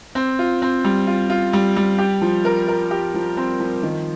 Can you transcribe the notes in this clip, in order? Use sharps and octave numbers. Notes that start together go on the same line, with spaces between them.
C4
F4
C4
G3
F4
F4
G3
G3
G4
F3
A#4
A#4
G4
F3
C4
F3
D#3